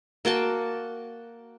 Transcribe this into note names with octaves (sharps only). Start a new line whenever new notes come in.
A#3 F#4 G5 A5